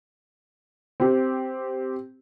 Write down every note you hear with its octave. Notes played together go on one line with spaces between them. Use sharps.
C4 G4